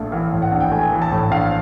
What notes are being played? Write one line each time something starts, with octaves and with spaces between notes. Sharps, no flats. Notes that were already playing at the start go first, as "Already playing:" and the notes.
Already playing: A#1 A2 A3 E5 F5
E3 F5
A2
F#5
A#1
G5
A3 G#5
E3
A5
A2
A#1 F5